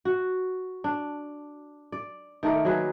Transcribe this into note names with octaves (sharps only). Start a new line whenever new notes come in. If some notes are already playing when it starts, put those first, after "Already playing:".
F#4
D4
D5
D#3 A3 A#4 D5
F#3 A#3 G#4 B4